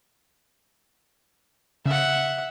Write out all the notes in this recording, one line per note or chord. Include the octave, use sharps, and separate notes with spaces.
C#3 E5 F#5